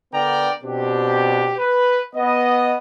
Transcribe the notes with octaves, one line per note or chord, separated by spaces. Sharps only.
D3 B3 A#4 D5 G5 A#5
B2 C4 D4 G4
B4
B3 D#5